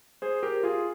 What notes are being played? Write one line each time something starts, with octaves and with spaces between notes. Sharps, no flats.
G#4 C5
G4 A#4
F4 G#4